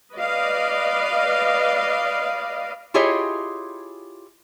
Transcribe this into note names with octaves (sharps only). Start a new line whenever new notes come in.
B4 D5 D#5 F5
E4 F4 G4 G#4 C#5 D#5